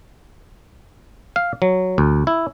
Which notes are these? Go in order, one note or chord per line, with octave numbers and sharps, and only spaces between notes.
F5
F#3
D2
E4